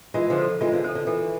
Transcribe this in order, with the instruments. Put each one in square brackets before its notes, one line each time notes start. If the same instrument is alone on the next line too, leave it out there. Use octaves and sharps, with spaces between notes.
[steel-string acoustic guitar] E3 G#3 [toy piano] F4
[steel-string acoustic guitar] D3 F3
[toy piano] A4 C5
[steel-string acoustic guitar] E3 G#3 [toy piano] F4
[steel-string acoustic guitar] D3 F3
[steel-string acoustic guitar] E3 [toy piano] A4 C5
[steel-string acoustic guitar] D3
[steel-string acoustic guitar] E3 [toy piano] A4